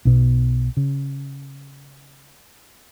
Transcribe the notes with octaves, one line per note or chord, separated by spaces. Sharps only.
B1 B2
C#3